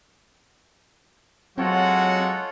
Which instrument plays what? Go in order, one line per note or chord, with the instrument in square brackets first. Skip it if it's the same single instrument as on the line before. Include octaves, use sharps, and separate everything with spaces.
[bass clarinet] F#3 [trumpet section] G#3 F#4 F#5 [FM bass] C4 [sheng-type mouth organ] F4 A4 C#5